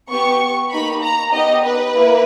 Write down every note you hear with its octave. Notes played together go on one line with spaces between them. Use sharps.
B3 G4 C#6
A#3 D#4 G4 B5
A#5
B3 D#4 G4 D#5
B4
A#3 E4